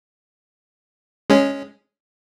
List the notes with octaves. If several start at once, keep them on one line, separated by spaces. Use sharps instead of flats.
G#3 C#4